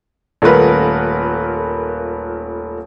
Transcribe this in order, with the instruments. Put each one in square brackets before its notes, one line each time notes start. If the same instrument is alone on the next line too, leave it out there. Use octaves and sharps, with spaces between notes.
[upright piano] D#1 A3 F4 A#4 B4